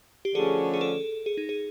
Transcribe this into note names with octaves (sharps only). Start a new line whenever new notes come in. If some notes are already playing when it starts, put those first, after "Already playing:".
G4
D3 F3 A3 C#4 G#4
G#4
A4
G#4
D#4
G#4